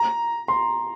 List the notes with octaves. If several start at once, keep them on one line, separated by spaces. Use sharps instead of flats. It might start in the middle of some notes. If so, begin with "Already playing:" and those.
Already playing: A#5
C6